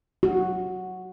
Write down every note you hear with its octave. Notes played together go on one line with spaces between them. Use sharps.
F#4